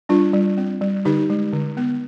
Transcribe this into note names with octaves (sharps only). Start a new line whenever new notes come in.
G3 D4 F4
G3
C4
G3
D3 D#4 G4
G#3
D3
B3